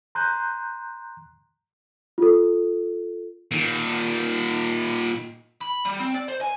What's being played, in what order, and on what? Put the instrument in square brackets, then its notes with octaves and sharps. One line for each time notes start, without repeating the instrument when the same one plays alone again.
[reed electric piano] A#5 C6 F#6 G6
[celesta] F4 A4
[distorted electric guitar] A#2 D#3
[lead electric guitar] B5
G3
C4
D5
C5
G#5